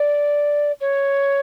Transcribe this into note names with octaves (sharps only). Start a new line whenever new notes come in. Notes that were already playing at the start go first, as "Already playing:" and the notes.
Already playing: D5
C#5